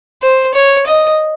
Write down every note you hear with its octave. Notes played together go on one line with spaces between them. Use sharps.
C5
C#5
D#5